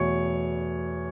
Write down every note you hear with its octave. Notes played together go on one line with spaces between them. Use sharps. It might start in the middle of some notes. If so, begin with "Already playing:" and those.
Already playing: E2 B2 A3 C#5